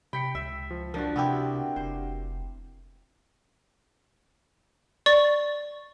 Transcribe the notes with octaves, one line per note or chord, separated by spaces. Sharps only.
C3 G5 B5 B6 C#7
C#2 E5 G5
F3
F3 D4 F#4 A#4
C3 B3 C4 E4 F#4 G4
F1 C5
D5 C#6 A6